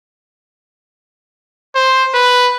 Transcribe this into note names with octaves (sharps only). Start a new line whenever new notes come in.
C5
B4